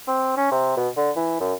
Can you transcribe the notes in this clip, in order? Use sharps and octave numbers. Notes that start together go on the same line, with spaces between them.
C4
C#4
C3
B2
D3
E3
F#2